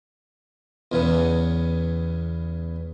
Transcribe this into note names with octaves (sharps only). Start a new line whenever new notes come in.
E2 C#3 B3